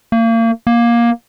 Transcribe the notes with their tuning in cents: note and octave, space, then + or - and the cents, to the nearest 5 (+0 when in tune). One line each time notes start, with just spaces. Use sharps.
A#3 -35
A#3 +15